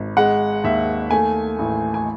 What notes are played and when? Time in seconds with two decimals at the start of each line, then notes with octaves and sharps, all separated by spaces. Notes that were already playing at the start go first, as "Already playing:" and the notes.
Already playing: G#1
0.17 G#3 F#5
0.64 D#2 E5
1.11 A3 G#5
1.59 A1
1.94 G#5